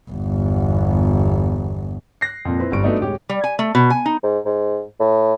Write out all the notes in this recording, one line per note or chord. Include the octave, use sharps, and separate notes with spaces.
G1 E2
F#6 A#6 C7
F2 A#2
C4 E4 B4 C5
G1 G3 C#6 D7
F#3 A3 B3 D4 D#4 D#5
D1 G#3 G4 C#5
G3
G#5
A3
B2
G#5
D#4
G#2
G#2
A2